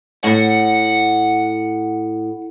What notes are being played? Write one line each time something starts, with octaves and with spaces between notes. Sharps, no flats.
A2 F#5